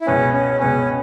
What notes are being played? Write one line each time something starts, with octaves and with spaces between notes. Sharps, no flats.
E4
C#2 B2 B3 C#4
C#4
C#2 B2 B3 C#4